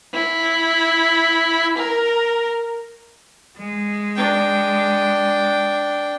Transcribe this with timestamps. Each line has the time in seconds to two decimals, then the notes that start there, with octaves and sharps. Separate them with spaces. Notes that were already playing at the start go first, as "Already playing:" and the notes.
0.14 E4
1.78 A#4
3.58 G#3
4.16 D4 G5